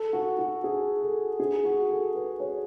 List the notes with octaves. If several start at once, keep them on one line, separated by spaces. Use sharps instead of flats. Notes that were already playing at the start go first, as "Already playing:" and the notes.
Already playing: A4
F#4
F#4
G#4
A4
G#4
F#4
A4
B4
C#5